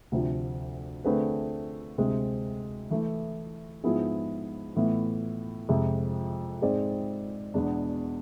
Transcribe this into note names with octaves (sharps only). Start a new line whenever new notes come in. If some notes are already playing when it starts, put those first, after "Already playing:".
D2 C3 F3
D3 A3 C4 G#4 B4
D2 C3 G#3 C4
E3 A3 E4
G#2 F3 B3 E4 G#4
A2 E3 B3
F2 C3 G#3
G#2 G#3 C4 G#4 D5
E2 B2 G#3 B3 D4